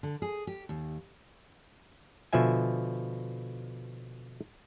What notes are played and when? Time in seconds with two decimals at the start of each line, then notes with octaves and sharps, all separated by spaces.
0.03 D3
0.22 G#4
0.47 G4
0.69 D#2
2.33 B2 D3 F3 E5 G#5